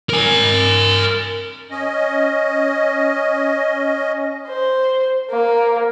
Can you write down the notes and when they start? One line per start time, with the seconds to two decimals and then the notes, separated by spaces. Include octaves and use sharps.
0.09 A#4 G#5
1.71 C#4 D#5
4.48 C5
5.30 A#3